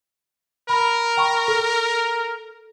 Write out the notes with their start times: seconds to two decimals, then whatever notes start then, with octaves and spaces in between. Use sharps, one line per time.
0.69 A#4 B5
1.17 G5 B5 C#6
1.48 A4